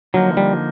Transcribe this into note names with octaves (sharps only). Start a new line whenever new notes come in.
D3 F3 F#3 A#3 D#4
G3